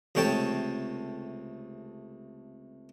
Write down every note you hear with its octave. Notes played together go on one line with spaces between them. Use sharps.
C#2 C3 A3 C#5 G5 A5